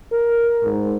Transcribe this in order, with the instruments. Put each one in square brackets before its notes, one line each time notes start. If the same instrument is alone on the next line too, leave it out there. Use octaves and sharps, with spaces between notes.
[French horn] A#4
G#2